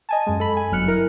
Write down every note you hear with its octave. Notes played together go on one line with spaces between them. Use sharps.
D#5 G#5 A5
F#2 G#3
A4 B5
G#5
G1 F#3 F6 F#6 C#7
E4 A#4